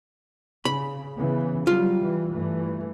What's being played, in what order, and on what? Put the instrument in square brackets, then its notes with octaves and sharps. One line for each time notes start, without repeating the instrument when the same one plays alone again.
[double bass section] C#3 [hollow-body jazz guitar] B5
[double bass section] C#3 E3 B3
[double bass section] F#3 G3 [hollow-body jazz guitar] F4
[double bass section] E3
G2 E3 A3